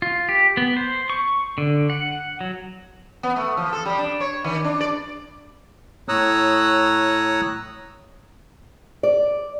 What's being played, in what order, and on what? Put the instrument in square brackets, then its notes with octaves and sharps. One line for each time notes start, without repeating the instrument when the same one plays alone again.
[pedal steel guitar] F4
G4
B3
C5
C#6
D3
F#5
F#3
[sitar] B3
A3
F3
A4
G3
D4
C#5
D#3
D4
D5
[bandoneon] A2 C#5 A#5 D#6 E6 F#6
[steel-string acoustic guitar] D5